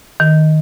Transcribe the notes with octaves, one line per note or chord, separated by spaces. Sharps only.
D#3